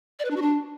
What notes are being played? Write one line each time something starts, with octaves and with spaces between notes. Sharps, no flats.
D5
B4
D4
F#4
D4